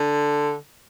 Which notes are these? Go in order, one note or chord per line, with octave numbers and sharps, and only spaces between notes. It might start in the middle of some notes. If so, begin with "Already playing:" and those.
Already playing: D3